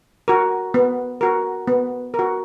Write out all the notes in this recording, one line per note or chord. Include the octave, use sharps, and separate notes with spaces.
F#4 A#4
B3
F#4 A#4
B3
A#4
F#4